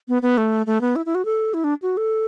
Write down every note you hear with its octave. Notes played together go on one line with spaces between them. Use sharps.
B3
B3
A3
A3
B3
E4
E4
F#4
A4
E4
D4
F#4
A4